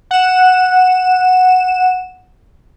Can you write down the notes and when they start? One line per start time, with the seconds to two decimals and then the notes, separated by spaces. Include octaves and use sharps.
0.11 F#5 E7